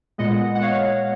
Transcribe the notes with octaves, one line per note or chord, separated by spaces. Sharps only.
A#2 G#3 B3 D#5 F#5
F#5
C#5 F5